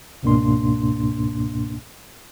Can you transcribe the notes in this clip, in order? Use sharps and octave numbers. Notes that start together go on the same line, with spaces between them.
C#2 G#2 B2 A#3 D4 C6